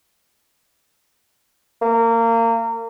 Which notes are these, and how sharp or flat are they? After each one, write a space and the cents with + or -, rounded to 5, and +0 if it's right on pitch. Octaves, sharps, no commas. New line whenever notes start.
A#3 -25